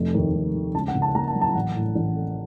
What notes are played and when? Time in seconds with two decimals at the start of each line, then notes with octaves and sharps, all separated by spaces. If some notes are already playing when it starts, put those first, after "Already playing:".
Already playing: F1 A3
0.14 D#2
0.35 F1
0.54 D#3
0.75 C#2 A5
0.88 F#5
0.95 C#3
1.02 A5
1.15 A#3 A#5
1.28 A5
1.35 F#3
1.41 A5
1.55 A1 F#5
1.75 A2
1.95 A1
2.16 A3